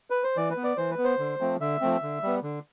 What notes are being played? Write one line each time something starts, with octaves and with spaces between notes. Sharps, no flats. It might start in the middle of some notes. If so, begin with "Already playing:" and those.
B4
C5
E3 D5
B4
B3
D5
E3 C5
B4
B3
C5
D3
F3 A3 C4
D3 E5
F3 A3 C4
D3
G3 B3
D3